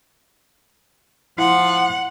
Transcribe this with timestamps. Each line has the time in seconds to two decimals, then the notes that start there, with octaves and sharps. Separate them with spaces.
1.38 F3 E4 F#5